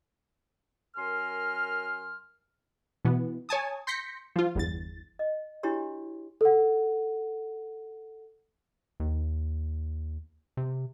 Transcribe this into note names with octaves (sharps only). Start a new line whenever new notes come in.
F#2 A#4 G#5 C6 F6
B2 E3 B3
C#5 G#5 A5 D#6
C6 G6 A#6 B6 C#7
F3 F4
G1 E2 A6
D#5
D4 E4 F#4 G4 C#5 C6
A4 F#5
D#2
C3